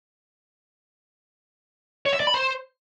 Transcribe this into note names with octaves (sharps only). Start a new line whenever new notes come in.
C#5
E5
D5
B5
C5